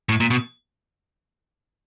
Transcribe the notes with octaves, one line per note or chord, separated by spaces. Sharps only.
A2
A#2
B2